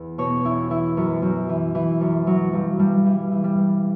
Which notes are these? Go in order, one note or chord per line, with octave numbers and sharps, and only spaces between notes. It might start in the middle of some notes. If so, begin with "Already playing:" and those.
Already playing: E2
B2 C#5
E2 E4
E3 E4
F#2
F#2
E3
E3
F#2
E3 F#3
G2 F#3
G2 G3
E3 G3
E3
G3
G2